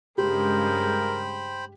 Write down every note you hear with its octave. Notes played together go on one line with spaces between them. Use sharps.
G2 C#3 G#3 G4 A#4 C5 G5 B5